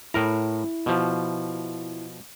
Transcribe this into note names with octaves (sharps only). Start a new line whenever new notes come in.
A2 E4 A#4 A#5
B2 F3